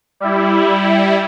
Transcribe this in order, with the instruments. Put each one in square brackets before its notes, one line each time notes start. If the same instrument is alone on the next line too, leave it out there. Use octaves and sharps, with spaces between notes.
[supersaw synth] G3 E4